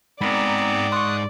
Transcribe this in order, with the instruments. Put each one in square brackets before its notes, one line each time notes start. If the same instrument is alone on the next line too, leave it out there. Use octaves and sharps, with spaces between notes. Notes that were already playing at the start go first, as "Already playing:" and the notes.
[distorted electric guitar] G#2 [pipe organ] B3 C4 [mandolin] A#4 B5 [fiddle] D5
[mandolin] C6 C#6 [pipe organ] D#6 F#6